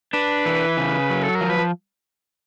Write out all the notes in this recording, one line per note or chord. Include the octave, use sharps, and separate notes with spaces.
D4 B4
E3
C#3
F#3
A4
A#4
F3
B4